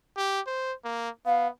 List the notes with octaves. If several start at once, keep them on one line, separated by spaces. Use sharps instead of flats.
G4
C5
A#3
B3 F5